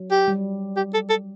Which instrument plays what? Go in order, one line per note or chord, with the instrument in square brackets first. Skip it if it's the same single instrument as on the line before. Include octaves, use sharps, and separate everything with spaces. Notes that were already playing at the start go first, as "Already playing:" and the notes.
Already playing: [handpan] F#3
[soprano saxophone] G4
[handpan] G3
[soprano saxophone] G4
A4
A4